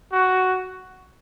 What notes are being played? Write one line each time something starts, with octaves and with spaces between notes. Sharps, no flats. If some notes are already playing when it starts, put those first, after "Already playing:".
F#4